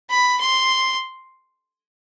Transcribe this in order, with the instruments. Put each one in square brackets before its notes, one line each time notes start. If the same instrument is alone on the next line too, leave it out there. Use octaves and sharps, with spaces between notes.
[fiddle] B5
C6